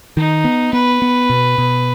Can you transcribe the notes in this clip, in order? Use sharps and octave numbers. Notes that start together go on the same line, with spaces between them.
D#3 D#4
B3
B3 B4
B3
B2
B2